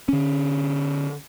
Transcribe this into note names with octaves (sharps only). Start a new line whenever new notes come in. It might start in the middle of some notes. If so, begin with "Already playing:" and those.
D3 C#4